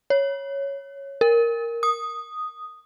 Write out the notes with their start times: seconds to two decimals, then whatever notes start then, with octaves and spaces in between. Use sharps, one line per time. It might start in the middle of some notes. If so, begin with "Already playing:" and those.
0.10 C#5
1.21 A#4
1.83 D#6